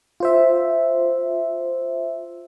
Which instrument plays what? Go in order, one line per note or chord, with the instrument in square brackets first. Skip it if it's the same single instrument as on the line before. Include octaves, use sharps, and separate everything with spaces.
[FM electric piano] F4 C5 E5